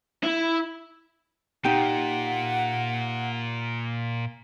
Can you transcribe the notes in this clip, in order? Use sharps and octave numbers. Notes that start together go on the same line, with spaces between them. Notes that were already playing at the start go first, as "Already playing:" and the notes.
E4
A#2 D#4 G4 F#5